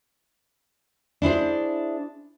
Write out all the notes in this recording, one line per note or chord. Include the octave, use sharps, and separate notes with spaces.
D4 E4 G#4 C5